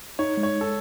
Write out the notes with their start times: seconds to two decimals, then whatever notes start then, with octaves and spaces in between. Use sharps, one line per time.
0.19 D#4 C#5
0.37 G#3
0.43 C#5
0.61 A4